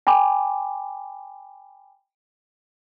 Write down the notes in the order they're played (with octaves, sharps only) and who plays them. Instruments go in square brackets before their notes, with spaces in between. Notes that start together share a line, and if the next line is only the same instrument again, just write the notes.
[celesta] G5 G#5 B5 D6